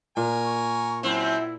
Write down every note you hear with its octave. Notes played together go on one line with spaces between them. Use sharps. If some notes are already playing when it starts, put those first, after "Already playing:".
A#2 A#4 G#5
C#6
F#2 C4 E4